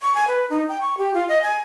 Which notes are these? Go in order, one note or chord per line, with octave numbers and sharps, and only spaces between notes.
C#6
G#5
B4
D#4
G5
C#6
G4
F4
D#5
G#5